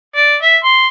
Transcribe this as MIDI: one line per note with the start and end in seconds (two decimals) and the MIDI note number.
0.16 0.36 74
0.42 0.58 76
0.64 0.88 84